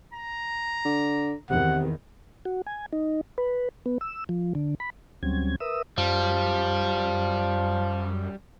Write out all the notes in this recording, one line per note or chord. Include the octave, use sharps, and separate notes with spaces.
A#5
D3
E2 C3 D#3 F#5
F#4
G#5
D#4
B4
B3
E6
F3
D3
B5
D2 F#3 G3 C4 C#4 G#6
A#4 B4 E5 D#6 E6
F#2 F3 G3